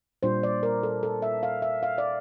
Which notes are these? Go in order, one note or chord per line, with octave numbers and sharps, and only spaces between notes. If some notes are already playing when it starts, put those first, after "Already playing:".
A#2 G3 D4 F4 C5
D5
A#4
A4
A4
E5
F5
E5
F5
D5